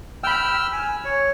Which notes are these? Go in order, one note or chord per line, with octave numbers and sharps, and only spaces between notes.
G5 B5 E6 F6
G#5
C#5